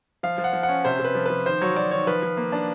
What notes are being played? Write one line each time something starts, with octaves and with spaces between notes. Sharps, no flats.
F3 F5
F3
F#5
F3
F#5
C#4
C3 C5
C3
B4
F3
F3 B4
D#3 C5
F#3 C#5
F#3 D5
D#3 C#5
F3 B4
F3
A#3
D4